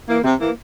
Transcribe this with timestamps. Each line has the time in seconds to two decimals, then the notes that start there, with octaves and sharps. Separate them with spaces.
0.08 E3 A#3
0.24 C3
0.40 E3 A#3